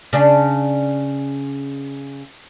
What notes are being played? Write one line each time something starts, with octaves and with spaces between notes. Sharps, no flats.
C#3 D4